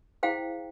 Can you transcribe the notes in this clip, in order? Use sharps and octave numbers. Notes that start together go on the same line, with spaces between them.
E4 G#4 C5 F5 G5